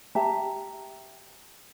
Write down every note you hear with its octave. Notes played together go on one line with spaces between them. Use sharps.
G4 E5 A5 A#5